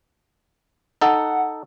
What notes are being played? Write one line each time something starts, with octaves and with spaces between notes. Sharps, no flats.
D#4 A4 F#5